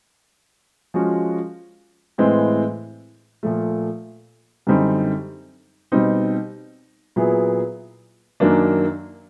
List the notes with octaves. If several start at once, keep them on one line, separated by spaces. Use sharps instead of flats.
F3 G#3 C#4 F#4
A2 E3 G#3 C4
A#2 F3 A3
F#2 D3 G3 C4 D#4
B2 G3 C4 D#4
A#2 F#3 B3 E4 G#4
F#2 D#3 F#3 A#3 D4